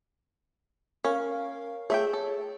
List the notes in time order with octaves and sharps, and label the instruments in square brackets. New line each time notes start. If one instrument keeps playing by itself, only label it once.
[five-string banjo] C#4 [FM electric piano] A#4 F5
[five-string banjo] A3 E5 G5 [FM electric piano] G#4 C#5
[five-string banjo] A4